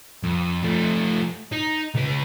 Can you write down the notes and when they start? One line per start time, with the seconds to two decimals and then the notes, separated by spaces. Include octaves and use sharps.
0.23 F2
0.63 F3 A3
1.52 D#4
1.95 C#2 B4